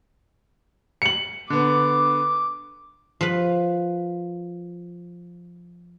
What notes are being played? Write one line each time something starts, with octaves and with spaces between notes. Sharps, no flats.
C#7 F#7
D3 B3 D6
F3 B4